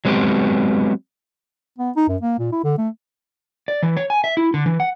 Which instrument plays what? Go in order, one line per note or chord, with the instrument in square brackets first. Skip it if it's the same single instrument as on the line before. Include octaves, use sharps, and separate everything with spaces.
[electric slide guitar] F#3 G#3 B3 C4 G4
[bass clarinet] B3
D#4
F#2
A#3
A#2
E4
D3
A3
[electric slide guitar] D5
E3
C#5
G#5
E5
E4
D3
E3
F#5